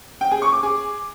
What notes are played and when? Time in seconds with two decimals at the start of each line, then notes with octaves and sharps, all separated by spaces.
0.21 G5
0.31 G#4
0.42 C#6
0.52 D6
0.63 G#4